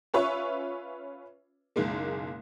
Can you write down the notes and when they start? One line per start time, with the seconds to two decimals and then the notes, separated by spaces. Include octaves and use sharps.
0.14 C#4 F4 B4 C#5 E5 C#6
1.76 F#1 B1 G#3 A#3